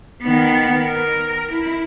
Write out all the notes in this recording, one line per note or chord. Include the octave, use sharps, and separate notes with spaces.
D#3 B3
A#4
E4